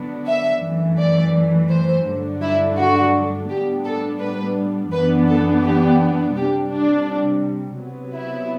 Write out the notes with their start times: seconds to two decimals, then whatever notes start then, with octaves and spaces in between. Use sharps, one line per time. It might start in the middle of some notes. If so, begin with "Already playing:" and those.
Already playing: D3 F#3 B3 D4
0.27 E5
0.63 F#2 E3 A3
0.99 D5
1.71 C5
2.06 G2 D3 F#3 A3 D4
2.42 E4
2.78 F#4
3.49 A2 G3 B3 D4 G4
3.85 A4
4.20 B4
4.92 F#2 E3 B3 D4 B4
5.28 A4
5.64 G4
6.35 C3 G3 D4 G4
6.71 D4
7.79 C3 F#3 B3
8.15 E4